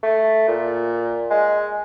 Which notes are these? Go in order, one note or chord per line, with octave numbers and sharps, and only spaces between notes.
A3
A#2
G#3